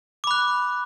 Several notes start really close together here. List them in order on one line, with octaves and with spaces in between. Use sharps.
D6 B5 F#6